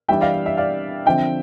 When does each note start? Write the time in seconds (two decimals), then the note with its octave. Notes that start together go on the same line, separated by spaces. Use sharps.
0.08 E3 G3 D4 E5 G5
0.21 D5 F5
0.34 D5
0.46 E5
0.57 D5 F5
1.06 D3 F3 C4 E5 G5